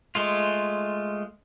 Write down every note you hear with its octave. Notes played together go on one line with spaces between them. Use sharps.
G#3 A3 F4